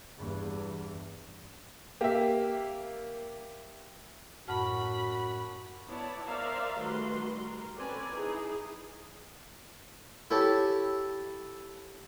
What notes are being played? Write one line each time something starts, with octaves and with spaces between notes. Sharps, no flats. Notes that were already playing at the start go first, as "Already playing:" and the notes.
E2 G2
A#3 G4 E5
F#2 A2 F#4 F#5 A5 B5 F6
B3 E4 C#5 D5 A5
A#4 C5 D5 E5 F5 A#5
D#3 G3 A3 F#4 B4 C6
A#4
C4 C#4 A4 B4 D5 G#5
D#4 E4 G#4
E4 G4 A4 C#5 A5